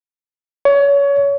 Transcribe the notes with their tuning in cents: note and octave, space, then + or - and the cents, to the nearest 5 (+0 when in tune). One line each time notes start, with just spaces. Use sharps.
C#5 +25